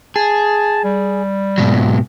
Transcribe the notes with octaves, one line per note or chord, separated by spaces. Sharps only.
G#4 A5
G3
G#2 B2 F#3